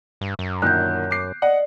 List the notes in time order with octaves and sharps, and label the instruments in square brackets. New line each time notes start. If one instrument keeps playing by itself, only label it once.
[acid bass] G2
F#2
[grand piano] A#2 D3 D#3 [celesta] F#6 G6
[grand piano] D6 C7
[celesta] D5 [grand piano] D#5 F#5